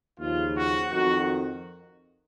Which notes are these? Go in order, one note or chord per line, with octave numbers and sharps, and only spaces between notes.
D#2 C#3 F3 F4
F#4
F2 D#3 F#4